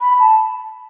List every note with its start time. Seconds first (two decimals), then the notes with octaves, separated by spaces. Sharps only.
0.01 B5
0.19 A5